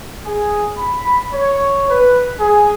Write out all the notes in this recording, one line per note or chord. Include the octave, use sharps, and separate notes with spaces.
G#4
B5
C#5
B4
G#4